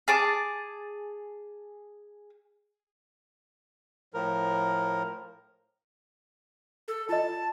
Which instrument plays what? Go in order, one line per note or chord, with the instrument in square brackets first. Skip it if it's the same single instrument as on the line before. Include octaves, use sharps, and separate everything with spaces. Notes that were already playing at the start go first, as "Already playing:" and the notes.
[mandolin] G#4 A5 D6
[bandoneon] A2 F3 A#4
[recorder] A4
[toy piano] F4 D#5 [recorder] A5